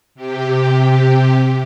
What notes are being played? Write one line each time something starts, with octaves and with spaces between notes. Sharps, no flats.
C3 G4